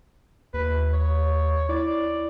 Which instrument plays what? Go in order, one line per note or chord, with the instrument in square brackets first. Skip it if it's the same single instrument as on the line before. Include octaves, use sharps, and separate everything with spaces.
[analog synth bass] D#2 [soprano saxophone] B4
[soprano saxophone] C#5
[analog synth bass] E4 [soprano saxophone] D5